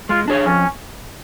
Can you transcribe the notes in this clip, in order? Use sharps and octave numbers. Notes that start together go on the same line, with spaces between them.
G#3 F4
D4 G#4 C#5
F2 C#4